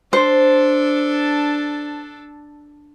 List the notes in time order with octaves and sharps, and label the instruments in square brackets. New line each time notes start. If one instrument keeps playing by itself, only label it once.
[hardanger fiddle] D4 A4 [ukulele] C5